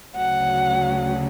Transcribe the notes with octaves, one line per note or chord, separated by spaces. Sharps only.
D2 C#3 F#3 F#5